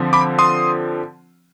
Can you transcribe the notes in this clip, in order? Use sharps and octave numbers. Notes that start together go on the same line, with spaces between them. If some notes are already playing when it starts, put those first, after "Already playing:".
Already playing: D3 F3 C4
B5 D6
C6 D#6